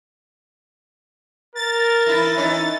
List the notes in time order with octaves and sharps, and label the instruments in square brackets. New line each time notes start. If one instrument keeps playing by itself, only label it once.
[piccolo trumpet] A#4 [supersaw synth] A6
[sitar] E3 E4
E3 C#4 D#4